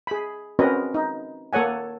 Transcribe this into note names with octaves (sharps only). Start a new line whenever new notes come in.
G#4 B5
C4 C#4 F#4 A#4 B4 D#5
D#4
A#3 A4 C#5 F#5 G#5